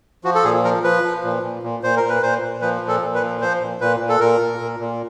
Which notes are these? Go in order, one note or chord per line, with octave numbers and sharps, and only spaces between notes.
F3 F#4
A4
A#2 G#4
F3 A#4
F3 B4
F3
A#2
A#2
A#2
A#2 C5
A#4
A#2
B4
A#2 C5
A#2
F3 B4
A#2
A4
A#2
B4
F3
F3 C5
A#2
A#2 B4
A#2
A4
A#2 A#4
A#2
A#2
A#2